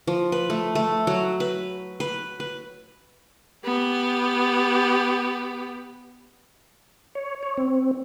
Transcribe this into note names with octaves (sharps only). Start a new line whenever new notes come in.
F3
B4
A3
A3
F#3
B4
B4
B4
B3 G4
C#5
C#5
C4